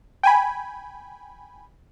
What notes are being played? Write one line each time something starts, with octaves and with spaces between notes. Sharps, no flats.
G5 G#5 B5